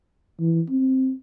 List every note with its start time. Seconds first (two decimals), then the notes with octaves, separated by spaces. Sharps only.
0.40 E3
0.69 C4